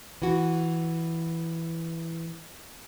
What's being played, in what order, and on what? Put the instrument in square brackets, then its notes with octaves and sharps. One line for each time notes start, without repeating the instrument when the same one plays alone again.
[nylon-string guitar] E3 F#4